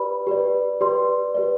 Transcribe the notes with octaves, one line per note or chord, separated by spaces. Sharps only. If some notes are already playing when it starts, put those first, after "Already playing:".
Already playing: G4 B4 D5 B5
G4 B4 D5
G4 B4 D5 C6
G4 B4 D5